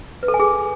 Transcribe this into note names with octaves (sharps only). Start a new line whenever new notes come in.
B4
A4
G#5
G#4